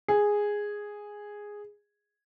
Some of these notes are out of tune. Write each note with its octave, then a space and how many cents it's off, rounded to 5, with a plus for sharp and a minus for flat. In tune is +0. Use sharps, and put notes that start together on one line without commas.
G#4 -5